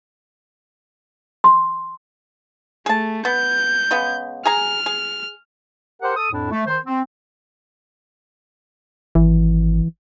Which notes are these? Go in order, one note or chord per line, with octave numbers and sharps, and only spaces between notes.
C6
A3 G#4 A5
B3 G6
C#3 G#3 B3
G#4 G#5 A#5 F6
G#4
G4 A#4 C5 F#5
A4 D#6
F2 A2 D4 E4
A3
D#3 C5
C4
G#1 E3